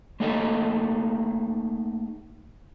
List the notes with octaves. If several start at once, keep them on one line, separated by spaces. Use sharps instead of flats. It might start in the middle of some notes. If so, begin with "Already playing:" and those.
A3 A#3 D#4 G#4 A4 D#5